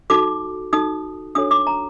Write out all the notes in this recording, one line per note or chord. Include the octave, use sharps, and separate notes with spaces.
D#4 F#4 A4 D6
D#4 F#4 A4 D#6
D4 F#4 A4 C#5 D#6
D6
A#5